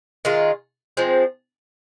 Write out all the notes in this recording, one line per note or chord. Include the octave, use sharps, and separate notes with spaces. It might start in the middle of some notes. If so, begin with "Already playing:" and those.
D#3 G#3 F4
F3 G#3 C4